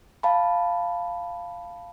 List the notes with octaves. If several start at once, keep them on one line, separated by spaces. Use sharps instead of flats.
F5 A5 B5